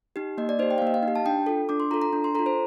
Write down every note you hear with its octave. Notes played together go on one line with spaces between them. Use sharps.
D#4 G4
A#3 D#5
D5
D#4 G4 C5
G5
F5
A#3 D#5
F5
D#4
G4
A5
D4 G5
F4 A4
D4 D6
C6
F4 A4 A#5
A#5
D4
C6
F4 A4 A#5
C5